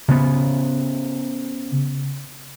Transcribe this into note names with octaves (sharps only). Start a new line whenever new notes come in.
C#3 B3